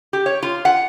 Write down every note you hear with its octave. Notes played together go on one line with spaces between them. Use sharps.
G4
C#5
F4
F#5